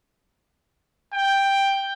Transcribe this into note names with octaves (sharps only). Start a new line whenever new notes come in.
G5